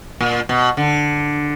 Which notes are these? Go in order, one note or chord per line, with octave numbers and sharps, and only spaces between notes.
A#2
B2
D3